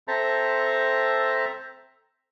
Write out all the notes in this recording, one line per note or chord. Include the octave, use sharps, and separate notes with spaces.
C4 A4 C5 E5 A5 A#5